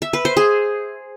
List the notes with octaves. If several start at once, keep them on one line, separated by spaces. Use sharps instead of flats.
E5
B4
C5
G#4